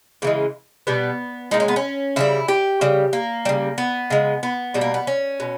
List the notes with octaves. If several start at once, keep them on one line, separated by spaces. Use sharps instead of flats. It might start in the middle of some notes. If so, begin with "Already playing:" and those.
C#3 E3 G#3 A#3
B2 G3 B3
A#2 G#3 D#4
C#4
B3
C#4
C#3 E3 G3 E4
G4
C#3 G3
A#3
C#3 G3
B3
C#3 G#3
B3
B2 G3
A#3
B3
C#4
B2